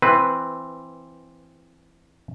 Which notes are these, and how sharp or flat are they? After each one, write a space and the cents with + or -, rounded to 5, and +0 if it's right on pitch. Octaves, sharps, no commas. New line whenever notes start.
E3 +10 C4 +0 B4 +0